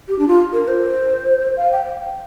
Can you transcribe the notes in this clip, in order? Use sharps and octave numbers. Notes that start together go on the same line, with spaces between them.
G4
D4
F4
A#4
C5
F5
G5